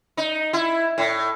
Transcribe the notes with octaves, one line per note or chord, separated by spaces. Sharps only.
D#4
E4
A2